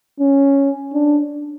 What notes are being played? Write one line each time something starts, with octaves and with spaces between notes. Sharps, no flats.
C#4
D4